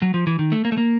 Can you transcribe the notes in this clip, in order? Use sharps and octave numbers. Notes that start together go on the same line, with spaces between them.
F#3
F3
E3
D#3
A3
A#3
A3
A#3